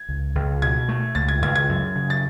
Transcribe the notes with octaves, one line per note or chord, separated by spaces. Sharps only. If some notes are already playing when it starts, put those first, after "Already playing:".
Already playing: G#6
C#2
C#2
B2 G#6
A3
C#2 A6
G#6
C#2 G#6
G#6
F#2
C#3
A6